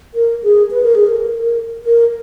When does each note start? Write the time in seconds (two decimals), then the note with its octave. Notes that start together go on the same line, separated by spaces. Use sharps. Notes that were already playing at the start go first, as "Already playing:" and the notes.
0.14 A#4
0.43 G#4
0.71 B4
0.83 A#4
0.95 G#4
1.06 A#4
1.84 A#4